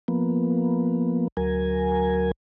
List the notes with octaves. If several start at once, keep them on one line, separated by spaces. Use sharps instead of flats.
F3 A#3 B3
D2 F#3 A#4 G#5